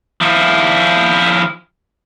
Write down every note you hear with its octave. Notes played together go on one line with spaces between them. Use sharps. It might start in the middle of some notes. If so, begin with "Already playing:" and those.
F3 E4